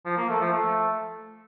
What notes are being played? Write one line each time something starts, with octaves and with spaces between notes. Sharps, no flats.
F3
A#3
A3
F3
A3